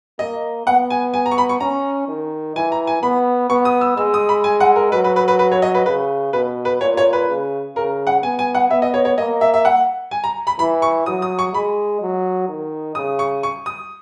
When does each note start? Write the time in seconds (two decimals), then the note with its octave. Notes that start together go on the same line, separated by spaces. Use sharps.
0.19 A#3 D#5
0.67 B3 F#5
0.90 G#5
1.14 G#5
1.26 A#5
1.31 C#6
1.38 B5
1.49 C#6
1.60 C#4 A#5
2.08 D#3
2.56 E3 G#5
2.72 A#5
2.87 G#5
3.02 B3 B5
3.50 B3 C#6
3.65 D#6
3.81 E6
3.97 G#3 E6
4.14 D#6
4.29 B5
4.44 G#5
4.60 F#5
4.76 A#4
4.92 F#3 B4
5.04 B4
5.16 B4
5.28 B4
5.39 B4
5.52 C#5
5.62 D#5
5.74 B4
5.86 C#3 B4
6.33 B2 B4
6.65 B4
6.81 A#2 C#5
6.97 C#5
7.13 B4
7.29 C#3
7.76 C#3 A#4
8.07 F#5
8.23 B3 G#5
8.39 G#5
8.55 F#5
8.70 B3 E5
8.82 D#5
8.94 C#5
9.05 C#5
9.18 A#3 D#5
9.41 E5
9.54 E5
9.65 F#5
10.11 G#5
10.24 A#5
10.47 B5
10.59 E3 B5
10.82 C#6
11.06 F#3 D#6
11.22 D#6
11.39 C#6
11.53 G#3 B5
12.02 F#3
12.49 D#3
12.95 C#3 D#6
13.19 C#6
13.43 C#6
13.66 D#6